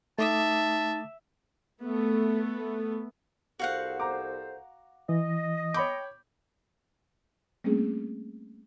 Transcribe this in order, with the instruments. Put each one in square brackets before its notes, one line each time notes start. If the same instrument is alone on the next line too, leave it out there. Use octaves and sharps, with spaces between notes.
[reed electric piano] A3 D6 D#6 [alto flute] D#4 [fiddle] E5 [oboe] A5
[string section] A3 B3
[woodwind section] C2 A4 C5 [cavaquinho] F#4 F5 F#5
[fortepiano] A#5 D6
[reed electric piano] E3 [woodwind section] D#5
[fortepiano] C#5 B5 D6 [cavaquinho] G5
[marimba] G3 A3 A#3 C4 C#4 G#4